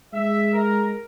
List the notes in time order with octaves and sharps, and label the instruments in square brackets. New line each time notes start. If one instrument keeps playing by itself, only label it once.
[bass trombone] G#3 [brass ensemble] E5
[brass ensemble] A#4